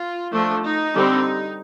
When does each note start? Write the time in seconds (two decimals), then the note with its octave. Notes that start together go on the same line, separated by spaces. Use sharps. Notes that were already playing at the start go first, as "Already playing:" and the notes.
Already playing: F4
0.32 F3 A3 D4
0.63 D#4
0.94 D3 G3 C4